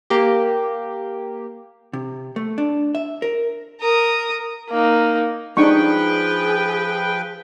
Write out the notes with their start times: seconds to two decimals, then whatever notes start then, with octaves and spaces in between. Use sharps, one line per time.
0.10 A#3 G4
1.93 C3
2.36 A3
2.58 D4
2.95 E5
3.22 A#4
3.80 A#4 D#6
4.70 A#3 D#4
5.57 F3 D4 D#4 G#4 B4 G5 C#6